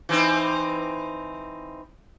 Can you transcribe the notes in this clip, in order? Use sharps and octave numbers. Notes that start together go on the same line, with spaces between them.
E3 C4 D#4